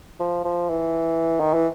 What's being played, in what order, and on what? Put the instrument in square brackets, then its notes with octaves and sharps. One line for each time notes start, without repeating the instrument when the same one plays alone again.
[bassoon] F3
F3
E3
D#3
E3